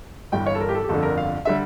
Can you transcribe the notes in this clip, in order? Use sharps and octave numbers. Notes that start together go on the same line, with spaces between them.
G1 G2 E3 G3 G5
C#5
A4
A#4
G4
A4
G4
G1 F2 D3 A4
A#4
F5
D3 G3 E5